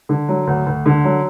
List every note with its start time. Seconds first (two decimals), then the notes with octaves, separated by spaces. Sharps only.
0.09 D3
0.29 F#3
0.47 D2
0.66 D2
0.86 D3
1.05 F#3